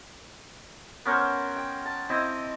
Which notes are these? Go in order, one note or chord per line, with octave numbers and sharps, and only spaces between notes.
B3 C#4 A#4 C5
G5
A5
C4 E4 D#5 D6